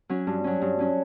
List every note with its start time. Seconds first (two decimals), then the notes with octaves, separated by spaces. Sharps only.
0.09 F#3 C#4
0.27 G2
0.44 F#3 C#4
0.62 G2
0.79 F#3 C#4